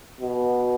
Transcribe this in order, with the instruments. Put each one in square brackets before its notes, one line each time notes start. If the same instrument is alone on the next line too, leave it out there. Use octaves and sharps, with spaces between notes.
[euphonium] B2